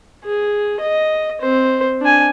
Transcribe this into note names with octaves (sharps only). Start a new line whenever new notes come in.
G#4
D#5
C4 C5
D4 G#5